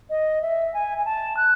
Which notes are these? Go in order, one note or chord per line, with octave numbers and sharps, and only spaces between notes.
D#5
E5
G#5
G#5
A5
F#6